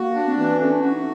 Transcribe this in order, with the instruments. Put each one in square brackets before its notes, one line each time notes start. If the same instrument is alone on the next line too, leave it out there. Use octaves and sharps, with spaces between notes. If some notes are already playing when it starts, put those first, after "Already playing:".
Already playing: [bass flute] A#3 [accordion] F#4
[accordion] D4
[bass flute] C4
[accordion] E3
[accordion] A3 [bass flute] C#4
[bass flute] D4
[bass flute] C#4 [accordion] F#4
[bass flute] D#4